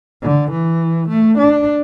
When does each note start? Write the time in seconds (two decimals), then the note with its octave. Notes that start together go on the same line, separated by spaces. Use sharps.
0.22 D3
0.51 E3
1.09 A3
1.38 D4